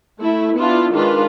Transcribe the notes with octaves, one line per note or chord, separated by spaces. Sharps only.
A3 E4
B3 D4 E4 F4
D#3 G#3 D4 F4 B4